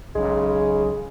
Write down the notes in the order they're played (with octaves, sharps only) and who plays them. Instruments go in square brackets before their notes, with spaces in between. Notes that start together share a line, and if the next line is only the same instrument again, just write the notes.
[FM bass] B1 [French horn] C#3 [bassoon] G#3